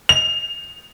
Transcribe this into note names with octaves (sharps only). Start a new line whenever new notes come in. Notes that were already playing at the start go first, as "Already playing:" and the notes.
F7